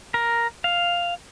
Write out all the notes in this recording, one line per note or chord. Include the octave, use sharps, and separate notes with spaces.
A#4
F5